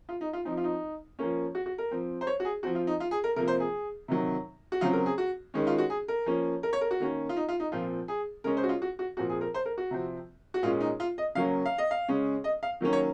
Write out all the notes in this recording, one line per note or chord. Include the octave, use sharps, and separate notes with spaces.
F4
D#4
F4
F3 C4 D#4
F4
D#4
F3 A#3 C#4
F#4
F#4
A#4
F3 C4
C5
C#5
F#4
G#4
F3 C4 F#4
F4
D#4
F4
G#4
A#4
C3 F3 A#3 A#4
C5
G#4
C3 D#3 F#3
F#4
C#3 F#3 C4 F4
A#4
G#4
F#4
D#3 G#3 C#4
F4
F#4
G#4
A#4
F3 A#3 C#4
A#4
C#5
A#4
F#4
D#3 A#3 C#4
F4
D#4
F4
D#4
A#2 F3 C4 F4
G#4
C#3 G#3 C#4 A#4
C5
F#4
F4
F#4
F#4
A#2 F3 C4 F#4
G#4
A#4
C5
A#4
F#4
C3 F3 C4
F#4
A#2 G#3 C#4 F4
D#4
F4
D#5
C#3 F#3 A#3 C#4 F5
F5
D#5
F5
C#3 G#3 C#4
D#5
F5
D#3 F#3 A#3 C#4
C#5